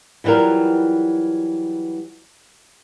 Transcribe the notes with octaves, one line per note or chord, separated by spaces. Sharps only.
E3 F#3 G3 F4 A#4